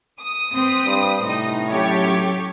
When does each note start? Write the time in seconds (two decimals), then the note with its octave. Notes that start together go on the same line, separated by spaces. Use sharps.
0.21 D#6
0.53 C4 B4 C5
0.86 G2
1.21 A2 C3 D#4
1.69 F#3 C#4 G4 A4 C#5